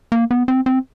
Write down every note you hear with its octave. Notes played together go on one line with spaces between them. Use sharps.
A#3
B3
C4
C4